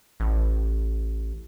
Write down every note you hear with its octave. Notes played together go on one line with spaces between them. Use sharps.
A1